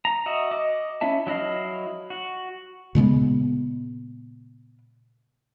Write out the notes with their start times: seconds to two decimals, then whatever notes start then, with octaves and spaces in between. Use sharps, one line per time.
0.05 A#5
0.26 F#4 D#5 E5
0.51 D#5 D6
1.01 C#4 E4 E5 A5
1.27 F#3 E4 D#5 F5
2.10 F#4
2.95 A#2 C#3 G#3 B3